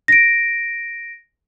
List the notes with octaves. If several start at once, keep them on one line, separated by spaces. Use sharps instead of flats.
A#6 D7